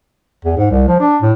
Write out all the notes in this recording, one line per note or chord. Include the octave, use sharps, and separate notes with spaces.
E2
G#2
C2
F3
D4
A2